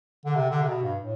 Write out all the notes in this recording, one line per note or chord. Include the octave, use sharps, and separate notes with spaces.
D3
C3
D3
C3
B2
G2
A2